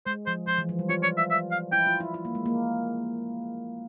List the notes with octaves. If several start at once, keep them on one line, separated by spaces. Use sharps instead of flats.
G#3 C5
F3 C5
F3 C5
E3
F3
G3
F4 C#5
C#5
E5
E5
F5
E4 G5
F4
E4
E4
A#3
G#3
A#3